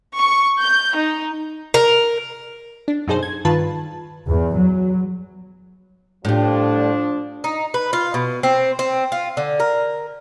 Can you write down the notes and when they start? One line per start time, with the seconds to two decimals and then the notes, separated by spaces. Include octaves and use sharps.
0.18 C#6
0.62 G6
0.96 D#4
1.74 A#4
2.88 D4
3.08 F#2 B2 D#4 G#4 A4 C5
3.23 G#6
3.45 G2 D#3 F4 B4 A5
4.28 E2
4.57 F#3
6.25 A2 F3 G3 D4
7.44 D#4
7.74 B4
7.93 F4
8.14 B2
8.43 C4
8.79 C4
9.12 F4
9.37 D3
9.60 A#4